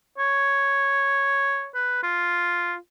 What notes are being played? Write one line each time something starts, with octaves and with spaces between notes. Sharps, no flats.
C#5
B4
F4